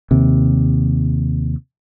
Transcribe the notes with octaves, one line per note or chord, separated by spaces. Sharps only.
D#2 C3